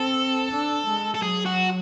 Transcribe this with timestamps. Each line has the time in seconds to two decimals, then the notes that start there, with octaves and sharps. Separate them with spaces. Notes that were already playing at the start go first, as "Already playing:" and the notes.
Already playing: C4 A4
0.52 D4
0.87 G#3
1.14 A4
1.22 F#3 G#4
1.46 F#4